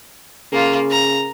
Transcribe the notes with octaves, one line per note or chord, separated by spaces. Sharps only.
C#3 A#3 F4
A#5